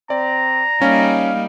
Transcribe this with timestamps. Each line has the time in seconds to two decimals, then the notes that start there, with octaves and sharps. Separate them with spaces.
0.10 C4 D5 A#5
0.82 G3 A#3 C#4 D#4 F5